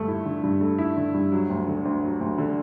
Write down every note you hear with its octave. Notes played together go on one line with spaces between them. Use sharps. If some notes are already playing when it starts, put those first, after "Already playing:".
Already playing: G2 D3 A3
E4
D3
G2
A3
E4
D3
G2
F#3
D2
D3
D2
F#3
D2
D3